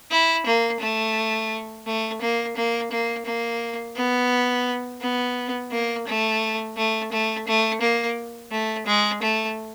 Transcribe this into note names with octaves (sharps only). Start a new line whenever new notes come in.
E4
A#3
A3
A3
A#3
A#3
A#3
A#3
B3
B3
A#3
A3
A3
A3
A3
A#3
A3
G#3
A3